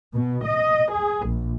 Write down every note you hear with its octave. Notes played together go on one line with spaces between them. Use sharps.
B2
D#5
G#4
A#1